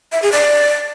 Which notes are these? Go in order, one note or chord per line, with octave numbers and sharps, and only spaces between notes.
E5
G#4
D5